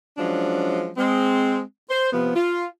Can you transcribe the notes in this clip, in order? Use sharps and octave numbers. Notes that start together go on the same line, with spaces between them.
F3 F#3 G#3 C#4 D4
G#3 C4
C5
C3 F3 B3
F4